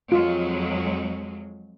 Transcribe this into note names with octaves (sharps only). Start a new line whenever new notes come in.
F2 F#3 G#3 F4